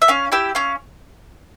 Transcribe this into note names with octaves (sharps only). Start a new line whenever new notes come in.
E5
C#4 F5
E4 G4 E5
C#4 F5